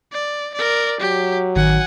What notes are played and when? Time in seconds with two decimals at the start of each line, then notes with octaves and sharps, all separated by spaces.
0.12 D5
0.55 A#4 D5
1.01 F#3 G4
1.56 A1 D#3 F#5 G#5